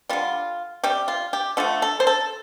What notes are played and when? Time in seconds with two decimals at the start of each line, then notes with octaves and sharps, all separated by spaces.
0.09 D3 G3 F4
0.83 C3 G3 G4
1.08 F4
1.33 G4
1.57 D3 F3 A3 A4
1.82 A4
2.00 C5
2.07 A4